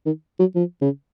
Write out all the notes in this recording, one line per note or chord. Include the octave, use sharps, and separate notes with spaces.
D#3
F#3
F3
C#3